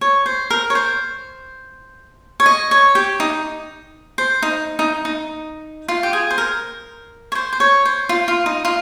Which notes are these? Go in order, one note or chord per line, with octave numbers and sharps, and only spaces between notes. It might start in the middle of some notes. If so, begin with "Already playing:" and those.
C#5
C5
A#4
C#5
C5
C#5
D#5
C#5
G4
D#4
C5
D#4
D#4
D#4
F4
G4
G#4
C5
A#4
C#5
C5
C5
C#5
C5
F4
F4
D#4
F4